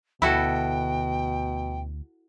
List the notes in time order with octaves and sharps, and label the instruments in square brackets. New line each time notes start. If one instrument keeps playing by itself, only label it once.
[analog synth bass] D2 [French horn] B2 [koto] E4 F#4 A4 [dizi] G5